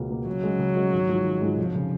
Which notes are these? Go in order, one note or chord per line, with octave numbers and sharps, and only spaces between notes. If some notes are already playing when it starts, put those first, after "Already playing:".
Already playing: C#2 B2 A#3
B2 A#3
C#3 F#3
G#3 C#4 F#4
C#3
G#3 C#4 F#4
G#1
G#2 F3 G#3 D#4
G#1
G#2 F3 G#3 D#4
F1 F3
C#3